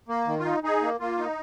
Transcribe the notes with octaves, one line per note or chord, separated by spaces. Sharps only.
A#3
D#3
F4
D#4
D#4 G#4
A#3
A#3 F4
D#4